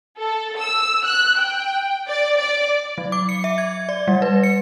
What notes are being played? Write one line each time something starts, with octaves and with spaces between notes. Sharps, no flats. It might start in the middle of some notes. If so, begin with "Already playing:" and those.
A4
E6
F#6
G5
D5
D5
F#3
D6
C#7
E5
G#6
D5
G3
B4
C#7